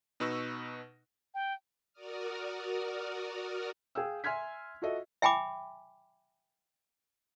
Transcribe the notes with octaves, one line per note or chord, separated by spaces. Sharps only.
B2 D#4 B4 C#6 E6 A#6
G5
F#4 A#4 D5 D#6 F6
G#4 F5 G5 E6
E5 G#5 C6 F6 G#6 B6
F4 F#4 A4 D#5 E5
E5 G5 G#5 B5 D6